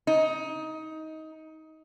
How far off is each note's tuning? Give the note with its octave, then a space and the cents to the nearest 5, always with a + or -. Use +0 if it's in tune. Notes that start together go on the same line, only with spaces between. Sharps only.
D#4 +20